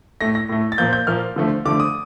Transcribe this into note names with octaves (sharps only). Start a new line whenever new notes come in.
A2 A3 A#6
A#6
A2 A3
A6
A#2 F3 A#3 G6
G6
A#2 F3 A#3 F6
D3 F3 A3
D3 F3 A3 D6
D#6